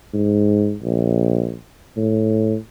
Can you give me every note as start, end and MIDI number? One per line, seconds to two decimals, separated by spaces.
0.14 0.76 44
0.83 1.57 34
1.97 2.56 45